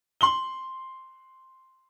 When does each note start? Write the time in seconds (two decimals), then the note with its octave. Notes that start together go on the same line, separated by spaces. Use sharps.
0.21 C6 F#7 G7